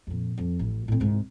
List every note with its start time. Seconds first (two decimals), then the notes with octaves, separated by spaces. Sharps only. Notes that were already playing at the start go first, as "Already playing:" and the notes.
0.07 F2 A#2
0.38 F2
0.59 A1
0.88 A2 C4
1.00 C2 G#2